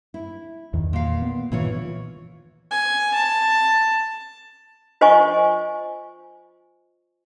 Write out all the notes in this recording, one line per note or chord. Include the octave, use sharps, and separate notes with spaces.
E4
E2 D#3
A#2 F5
B3
A#2 D#3 E3 F4 C#5
G#5
A5
F4 C5 D#5 G#5 C#6